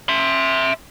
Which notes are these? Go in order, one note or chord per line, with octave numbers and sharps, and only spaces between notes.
E5 C6